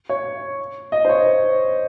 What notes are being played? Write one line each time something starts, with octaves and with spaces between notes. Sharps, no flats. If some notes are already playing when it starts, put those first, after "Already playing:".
C#5
D#5
C5
C#5